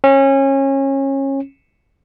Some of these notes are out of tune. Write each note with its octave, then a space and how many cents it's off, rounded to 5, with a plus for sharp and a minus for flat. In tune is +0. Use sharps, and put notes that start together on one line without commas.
C#4 -25